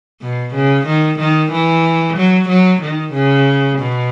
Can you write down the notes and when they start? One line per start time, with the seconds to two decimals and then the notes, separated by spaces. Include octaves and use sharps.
0.21 B2
0.54 C#3
0.86 D#3
1.19 D#3
1.52 E3
2.17 F#3
2.49 F#3
2.82 D#3
3.14 C#3
3.78 B2